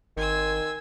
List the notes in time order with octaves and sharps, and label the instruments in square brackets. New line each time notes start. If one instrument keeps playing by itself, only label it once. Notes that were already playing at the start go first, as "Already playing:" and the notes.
[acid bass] G#1 [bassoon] D#3 [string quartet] G#5 C6 E6